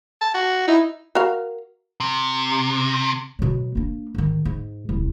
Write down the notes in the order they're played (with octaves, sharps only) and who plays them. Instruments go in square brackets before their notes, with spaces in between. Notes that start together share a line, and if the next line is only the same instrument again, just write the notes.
[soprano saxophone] A5
F#4
[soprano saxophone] D#4 [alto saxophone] E4
[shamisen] F#4 A#4 F5
[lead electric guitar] C3
[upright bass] B2 F#3
A#3 D4
G#2 D#3
G#2
D#1 C2